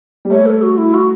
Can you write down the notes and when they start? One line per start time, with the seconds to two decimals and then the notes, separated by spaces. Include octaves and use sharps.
0.25 G3
0.30 A3 C#5
0.46 A4
0.62 F#4
0.78 E4
0.94 F#4